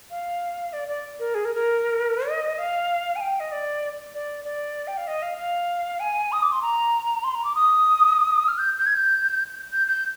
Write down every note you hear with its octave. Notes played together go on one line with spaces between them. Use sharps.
F5
D5
D5
A#4
G#4
A#4
A#4
D#5
F5
G#5
G5
D#5
D5
D5
D5
G5
F5
D#5
F5
F5
G#5
D#6
D6
C6
A#5
C6
A#5
D6
D#6
F6
G6
G6
G#6
G6
G6
G6